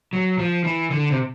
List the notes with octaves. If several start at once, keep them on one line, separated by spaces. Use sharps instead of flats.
F#3
F3
E3
D3
C3